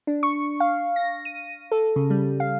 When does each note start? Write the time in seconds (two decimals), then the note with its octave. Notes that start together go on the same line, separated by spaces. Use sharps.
0.07 D4
0.23 C#6
0.60 F5
0.96 A#6
1.25 D#7
1.72 A4
1.96 C#3
2.10 G3
2.40 F5